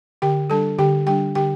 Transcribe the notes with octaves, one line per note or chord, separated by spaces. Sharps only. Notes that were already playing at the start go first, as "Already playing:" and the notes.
D3 G4 G5
G3 D4 A4 A5
D3 G4 G5
G3 D4 G4 G5
D3 G4 G5